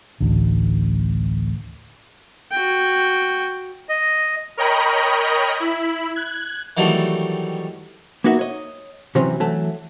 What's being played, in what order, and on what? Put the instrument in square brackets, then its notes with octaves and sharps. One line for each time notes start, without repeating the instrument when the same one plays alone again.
[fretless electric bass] A1 D2
[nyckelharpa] F#4 G5
[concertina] D#5
[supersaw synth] A#4 C#5 D#5 G5 A#5 B5
E4 B5
F#6 G#6
[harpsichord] D#3 E3 F#3 G3 A3
[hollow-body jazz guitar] A#3 B3 D#4 F#4 D5 E5
C#5 D#5
C3 E3 F#3 G3 C4 C#4
E3 F#3 A3 A5